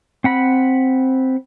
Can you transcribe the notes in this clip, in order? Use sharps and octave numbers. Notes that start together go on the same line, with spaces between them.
C4 F#5 B5